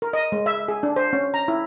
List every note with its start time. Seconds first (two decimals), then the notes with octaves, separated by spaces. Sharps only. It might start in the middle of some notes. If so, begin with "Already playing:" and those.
0.02 A#4
0.13 D#5
0.32 G#3
0.46 E5
0.68 G#4
0.83 D4
0.96 C5
1.13 C#4
1.34 A#5
1.48 E4